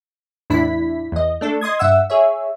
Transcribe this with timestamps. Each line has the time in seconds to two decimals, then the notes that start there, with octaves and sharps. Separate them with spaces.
0.50 E2 A2 D4 E4 B5 B6
1.12 E2 D#5
1.41 A3 D4 A4
1.61 D#5 C6 D#6 G#6
1.79 G2 E5 F#5 E6
2.10 G#4 C#5 E5